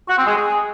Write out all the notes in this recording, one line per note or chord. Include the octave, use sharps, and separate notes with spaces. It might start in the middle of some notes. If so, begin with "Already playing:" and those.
F#4
C4
G#3
G#4